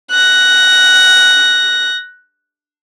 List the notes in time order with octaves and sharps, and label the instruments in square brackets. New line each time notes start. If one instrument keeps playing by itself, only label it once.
[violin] F#6 A#6